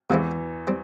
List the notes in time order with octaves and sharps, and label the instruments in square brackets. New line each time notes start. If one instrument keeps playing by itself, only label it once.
[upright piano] E2 E3 [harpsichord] C3 F3 G#3 C4 E4
[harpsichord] G3 C4